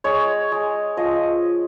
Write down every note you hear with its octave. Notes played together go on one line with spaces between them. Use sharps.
G#3 C#5
G#3
F3 D#5